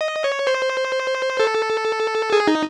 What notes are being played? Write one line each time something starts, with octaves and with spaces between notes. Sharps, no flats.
D#5
C#5
C5
A4
G#4
D#4